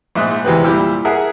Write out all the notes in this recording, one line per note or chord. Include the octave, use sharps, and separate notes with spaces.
A#1 G#2 E5 C6 D#6 F#6
E2 C3 E3 G#3 C4 B4
A#2 G3 E4 G4 G5 E6
G#4 A#4 E5 F#5